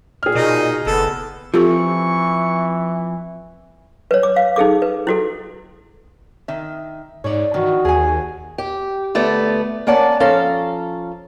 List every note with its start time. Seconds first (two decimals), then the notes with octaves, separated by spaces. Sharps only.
0.23 A#2 G#4 F6
0.35 B2 D#4 D#5
0.86 F#1 B3 A4
1.54 E3 F3 C4 F4 G4 A4 C#6
4.11 B4 C#5
4.23 D6
4.36 F5
4.56 D#4 G#4 A4 D6
4.82 B4
5.07 E4 F#4 A4
6.48 D#3 E5
7.24 G#2 C#5 D5
7.54 D#3 E3 F#4
7.85 D#2 G#4 G#5
8.58 G4
9.15 D2 A3 B3 D5
9.87 A#3 C#4 D5 F#5 A5
10.20 F3 C#4 A4 F5 A#5